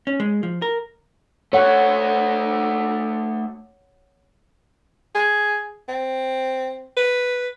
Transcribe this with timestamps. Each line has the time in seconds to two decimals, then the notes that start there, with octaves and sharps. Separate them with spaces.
0.07 C#4
0.20 G#3
0.43 F3
0.62 A#4
1.53 A3 F#4 C#5 F#5
5.15 G#4
5.89 C4
6.97 B4